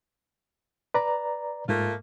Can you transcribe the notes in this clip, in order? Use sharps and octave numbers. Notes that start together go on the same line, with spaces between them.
B4 D5 A#5
G#2 A3 A#3 F4